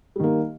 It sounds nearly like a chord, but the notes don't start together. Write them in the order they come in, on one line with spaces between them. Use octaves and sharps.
G3 D#3 A#3